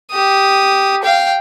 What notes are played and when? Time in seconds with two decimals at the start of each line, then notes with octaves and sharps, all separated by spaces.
0.12 G4 D#6
1.03 F5 G5